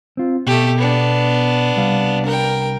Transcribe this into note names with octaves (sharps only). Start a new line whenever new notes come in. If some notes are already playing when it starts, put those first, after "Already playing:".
C4 F4
B2 A3 G4
B3 D4
C2 G3 F5
A#4 G5